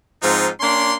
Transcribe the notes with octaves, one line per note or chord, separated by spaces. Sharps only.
G#2 F3 C4 D#4 F4
A#3 C#4 D4 C6